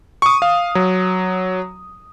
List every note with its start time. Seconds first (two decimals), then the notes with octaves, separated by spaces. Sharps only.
0.22 C#6 D#6
0.42 F5
0.75 F#3